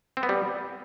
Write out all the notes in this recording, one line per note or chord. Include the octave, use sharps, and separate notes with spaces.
C4
B3
G3